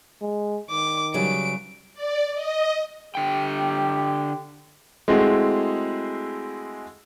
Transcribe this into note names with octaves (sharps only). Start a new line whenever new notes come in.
G#3
D#3 D6
C#3 F#3 G3 D7
D5
D#5
D3 G4 G5
G#3 A3 C4 E4 F#4 G#4